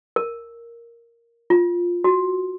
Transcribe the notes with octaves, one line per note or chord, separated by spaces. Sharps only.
A#4
F4
F#4